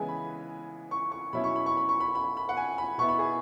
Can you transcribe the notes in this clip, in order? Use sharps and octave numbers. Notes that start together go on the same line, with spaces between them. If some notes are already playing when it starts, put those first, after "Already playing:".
Already playing: C#3 E3 G#3 B3 G#5
B5
C#6
C#6
B2 F#3 C#4 E4 B5
C#6
B5
C#6
B5
C#6
B5
B5
B5
F#5
G#5
B5
B2 B3 E4 C#6
B5
G#4